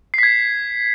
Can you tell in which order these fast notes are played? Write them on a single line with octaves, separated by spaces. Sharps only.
C7 B6 G#6